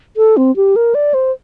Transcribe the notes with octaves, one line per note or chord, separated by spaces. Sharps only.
A4
C4
G4
A#4
D5
C5